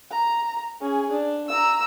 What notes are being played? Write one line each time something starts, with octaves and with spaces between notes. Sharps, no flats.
A#5
C#4 G#4
D4
A#5 E6